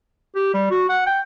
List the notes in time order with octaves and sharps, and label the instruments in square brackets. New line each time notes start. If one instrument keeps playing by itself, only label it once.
[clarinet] G4
G3
F#4
F#5
G5